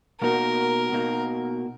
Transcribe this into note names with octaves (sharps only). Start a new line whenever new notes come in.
B2 A#3 D#4 F#4 A#4
B2 A#3 D#4 F#4